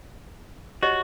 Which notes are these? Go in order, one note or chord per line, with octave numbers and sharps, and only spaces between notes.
F#4 G4 C#5 D#5